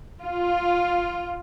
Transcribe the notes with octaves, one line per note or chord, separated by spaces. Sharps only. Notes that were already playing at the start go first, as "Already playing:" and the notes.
F4